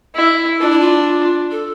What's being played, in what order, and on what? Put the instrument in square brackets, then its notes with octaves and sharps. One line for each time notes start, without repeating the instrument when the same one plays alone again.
[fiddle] E4
[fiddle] D4 [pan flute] F4
[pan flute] E4
F4
A4